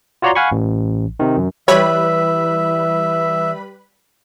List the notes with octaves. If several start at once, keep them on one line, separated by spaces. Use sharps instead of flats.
F4 F#4 C#5 D5 A#5 C6
F5 F#5 G#5 B5 C#6
A1
C3 D#3
F#2
E3 G3 B4 C#5 E5 B5